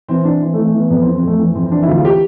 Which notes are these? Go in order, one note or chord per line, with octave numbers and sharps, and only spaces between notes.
E3 C4
E3 D4
E3 C4
A3
E3
A3
E3 B3
F2 B3
C4
E3
C4
F2 A3
E3
F2 C4
C4
E3 D4
E4
D2 F4
F4
G4